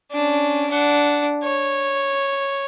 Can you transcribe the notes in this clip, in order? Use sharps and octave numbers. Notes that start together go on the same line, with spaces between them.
C#4 D4
D4 F#5
C#5